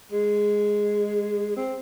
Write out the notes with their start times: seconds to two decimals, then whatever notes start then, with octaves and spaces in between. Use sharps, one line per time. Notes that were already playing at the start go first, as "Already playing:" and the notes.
0.12 G#3
1.56 C4